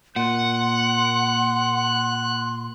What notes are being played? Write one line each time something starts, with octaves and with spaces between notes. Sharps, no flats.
A#2 F#5 C6 F#6